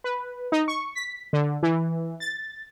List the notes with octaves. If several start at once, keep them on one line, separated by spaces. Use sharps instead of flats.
B4
D#4
C#6
B6
D3
E3
A6